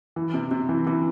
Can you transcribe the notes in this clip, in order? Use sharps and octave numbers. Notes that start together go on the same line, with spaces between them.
E3
C3
C3
E3
E3